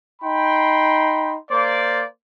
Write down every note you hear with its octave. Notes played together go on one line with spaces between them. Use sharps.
D#4 G5 B5 C6
A#3 C5 D5